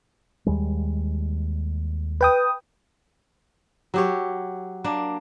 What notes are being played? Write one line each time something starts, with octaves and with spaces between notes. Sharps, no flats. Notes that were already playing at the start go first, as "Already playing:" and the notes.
D#2 G3 G#3
B4 G5 D#6
F#3 G4 C#5
A#3 D4